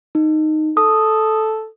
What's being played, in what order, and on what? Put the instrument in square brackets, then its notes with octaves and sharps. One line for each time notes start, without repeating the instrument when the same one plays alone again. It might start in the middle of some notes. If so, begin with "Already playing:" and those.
[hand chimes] D#4
[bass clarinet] A4 [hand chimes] D#6